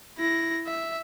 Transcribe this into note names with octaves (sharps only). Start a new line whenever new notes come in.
E4 A#6
E5